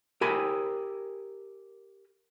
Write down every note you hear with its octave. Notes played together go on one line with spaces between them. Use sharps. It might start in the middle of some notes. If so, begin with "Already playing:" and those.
G4 A#4 G#5 B5